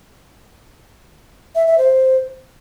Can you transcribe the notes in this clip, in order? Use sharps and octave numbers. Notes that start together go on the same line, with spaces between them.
E5
E5
C5